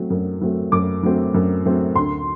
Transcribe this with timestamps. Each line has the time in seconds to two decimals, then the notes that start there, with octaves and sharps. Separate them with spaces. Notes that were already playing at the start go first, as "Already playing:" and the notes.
Already playing: F#3 A3 C4
0.10 F#2
0.41 F#3 A3 C4
0.72 F#2 D6
1.03 F#3 A3 C4
1.34 F#2
1.65 F#3 A3 C4
1.96 D2 C6